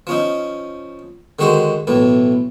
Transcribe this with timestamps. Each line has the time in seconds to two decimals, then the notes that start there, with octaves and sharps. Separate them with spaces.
0.07 F3 C#4 D#4
1.39 D3 D#3 G#3 F#4 C5
1.87 B1 A2 E3